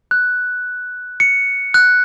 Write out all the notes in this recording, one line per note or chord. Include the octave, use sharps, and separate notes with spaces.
F#6
C#7
F#6